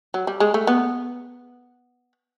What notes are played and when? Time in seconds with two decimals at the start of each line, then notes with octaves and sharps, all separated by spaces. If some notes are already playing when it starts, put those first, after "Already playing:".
0.14 F#3
0.27 G3
0.40 G#3
0.54 A3
0.67 B3